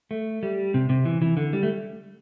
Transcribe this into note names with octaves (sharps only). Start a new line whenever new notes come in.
A3
G3
C3
C3
E3
E3
D3
G3
A3